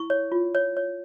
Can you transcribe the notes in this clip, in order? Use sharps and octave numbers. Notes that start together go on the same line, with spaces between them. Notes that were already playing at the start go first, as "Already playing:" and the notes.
Already playing: E4 C#6
C#5
F4
C#5
C#5